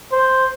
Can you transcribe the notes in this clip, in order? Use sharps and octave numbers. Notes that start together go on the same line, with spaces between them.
C5